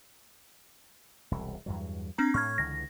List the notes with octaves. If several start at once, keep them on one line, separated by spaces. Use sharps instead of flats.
E1 C2
E2 G2 F#3
C4 D4 A#5
A2 C#6 F6 G#6
C#2 D3 E3 A#6